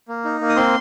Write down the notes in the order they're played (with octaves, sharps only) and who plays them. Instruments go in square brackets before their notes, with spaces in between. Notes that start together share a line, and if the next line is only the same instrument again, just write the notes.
[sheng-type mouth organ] A#3
D#4
A#3
D#6
C4 C6